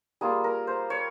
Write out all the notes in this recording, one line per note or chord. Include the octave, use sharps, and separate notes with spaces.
G3 A#3 F4 G#4
A#4
C5
C#5